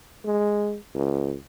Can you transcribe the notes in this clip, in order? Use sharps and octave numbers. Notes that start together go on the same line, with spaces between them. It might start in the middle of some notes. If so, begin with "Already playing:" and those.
G#3
C#2